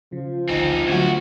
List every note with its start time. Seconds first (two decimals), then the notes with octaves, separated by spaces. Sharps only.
0.12 C#3 F3
0.49 A1 D2 C4 D#4
0.88 D2 D3 F#3 F#4